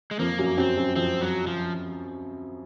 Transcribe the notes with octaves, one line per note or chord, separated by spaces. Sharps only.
G#3
F2 F3 A#3
F#2 F#3
F#2 F#3 C4
F#2 F#3
F2 F3 C4
F#3
F3